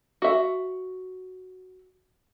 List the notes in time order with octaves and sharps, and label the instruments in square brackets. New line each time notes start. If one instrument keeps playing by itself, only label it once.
[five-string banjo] F#4 E5